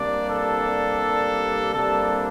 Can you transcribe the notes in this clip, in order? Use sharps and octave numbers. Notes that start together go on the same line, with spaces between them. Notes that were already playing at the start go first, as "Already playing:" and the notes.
Already playing: C3 G3 A#3 D4 D5
A4
C3 G3 A#3 D4 A4